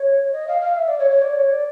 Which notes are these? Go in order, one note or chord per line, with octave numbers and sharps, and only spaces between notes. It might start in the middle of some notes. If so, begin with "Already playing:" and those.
Already playing: C#5
D#5
F5
F5
E5
D5
C#5
C#5
D5
C#5
D5